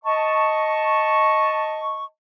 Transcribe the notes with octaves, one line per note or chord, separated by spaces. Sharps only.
D#5 A5 C#6